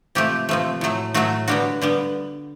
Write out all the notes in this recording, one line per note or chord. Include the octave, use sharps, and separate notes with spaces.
C3 F3 A3 G4
C3 F3 A3
A2 F#3 A3
A2 F#3 A3 F#4
D3 G3 B3 F#4
D3 G3 B3